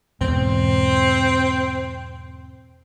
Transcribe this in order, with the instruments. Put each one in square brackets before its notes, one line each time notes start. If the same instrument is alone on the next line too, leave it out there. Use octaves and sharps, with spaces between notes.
[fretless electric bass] E2 G#2 B2 [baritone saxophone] C4